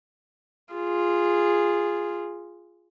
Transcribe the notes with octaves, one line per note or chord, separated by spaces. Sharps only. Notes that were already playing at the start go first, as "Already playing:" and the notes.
F4 G#4